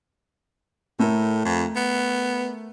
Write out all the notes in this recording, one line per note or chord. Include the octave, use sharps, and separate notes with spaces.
A2 A3 A#4
F2
B3